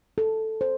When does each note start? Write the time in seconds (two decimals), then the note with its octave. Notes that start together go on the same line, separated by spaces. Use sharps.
0.18 A4
0.61 C5